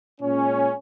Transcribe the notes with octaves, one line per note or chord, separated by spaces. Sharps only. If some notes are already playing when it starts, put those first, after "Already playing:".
A#2 G#3 C#4